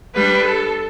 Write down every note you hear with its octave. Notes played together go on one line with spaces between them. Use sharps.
G3 D4 B4
A4